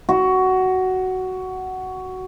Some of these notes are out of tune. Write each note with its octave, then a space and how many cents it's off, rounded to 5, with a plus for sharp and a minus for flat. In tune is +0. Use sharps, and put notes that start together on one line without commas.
F#4 +10